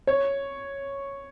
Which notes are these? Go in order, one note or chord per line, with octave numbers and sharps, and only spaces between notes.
C#5